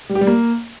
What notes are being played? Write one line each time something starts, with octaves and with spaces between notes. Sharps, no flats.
G3
G4
G3
A#3